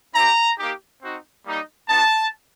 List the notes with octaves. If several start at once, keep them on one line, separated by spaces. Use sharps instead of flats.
C4 E4 G4 A#5
A#3 D#4 G4
C4 D#4 F#4
G3 A#3 D#4
B3 D#4 F#4 A5